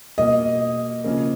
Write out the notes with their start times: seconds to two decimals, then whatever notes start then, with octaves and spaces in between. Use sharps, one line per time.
0.18 B2 A#3 D#5
1.04 C#3 F3 A#3